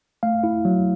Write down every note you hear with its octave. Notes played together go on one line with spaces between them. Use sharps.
A3 F5
E4
F#3